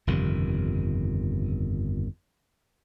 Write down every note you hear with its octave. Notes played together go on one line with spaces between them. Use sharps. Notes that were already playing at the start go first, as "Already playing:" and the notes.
G1 F2 C3 D#3